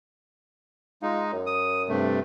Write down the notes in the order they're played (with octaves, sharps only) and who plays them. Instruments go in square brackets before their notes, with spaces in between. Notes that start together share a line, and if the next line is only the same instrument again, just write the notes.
[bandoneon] G#3 D#4 [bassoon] F4
[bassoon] F#2
[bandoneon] D#6
G2 C3 A3